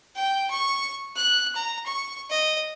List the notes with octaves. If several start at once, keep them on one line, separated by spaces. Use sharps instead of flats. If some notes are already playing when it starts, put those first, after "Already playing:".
G5
C#6
F#6
A#5
C#6
D#5